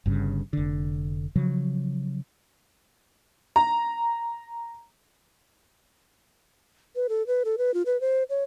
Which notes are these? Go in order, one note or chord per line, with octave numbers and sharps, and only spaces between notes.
G1 G2 C#3
F1 D3
C#3 F3 F#3
A#5
B4
A4
B4
A4
B4
F4
B4
C5
C#5